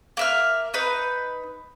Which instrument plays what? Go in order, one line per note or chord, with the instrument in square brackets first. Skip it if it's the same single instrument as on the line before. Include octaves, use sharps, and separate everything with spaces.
[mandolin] A#3 E5 F6
D#4 B4